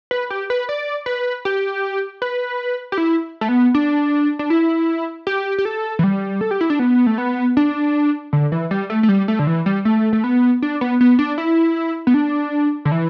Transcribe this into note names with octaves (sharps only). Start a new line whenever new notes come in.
B4
G4
B4
D5
B4
G4
B4
G4
E4
A3
B3
D4
D4
E4
G4
G4
A4
E3
G3
A4
G4
E4
D4
B3
A3
B3
D4
D3
E3
G3
A3
A3
G3
A3
D3
E3
G3
A3
A3
B3
D4
B3
B3
D4
E4
B3
D4
D3
E3